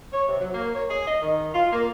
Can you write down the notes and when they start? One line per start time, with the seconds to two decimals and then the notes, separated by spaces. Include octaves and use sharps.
0.12 C#5
0.27 C3
0.41 F#3
0.53 A#3
0.74 C#5
0.89 G#4
1.05 D#5
1.21 D#3
1.54 F4
1.72 A#3